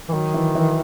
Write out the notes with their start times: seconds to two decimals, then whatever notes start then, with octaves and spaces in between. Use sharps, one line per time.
0.09 E3
0.13 D#3 F#3
0.34 E3
0.55 E3